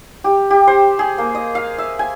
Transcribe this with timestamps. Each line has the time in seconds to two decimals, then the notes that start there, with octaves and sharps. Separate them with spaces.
0.24 G4
0.50 G4
0.67 C5
0.99 G#4
1.18 A#3
1.35 D#5
1.55 F5
1.78 E5
1.99 G#5